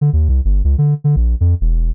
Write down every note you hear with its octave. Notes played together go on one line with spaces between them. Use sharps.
D3
D#2
C2
G1
C#2
D3
D3
A#1
F2
E1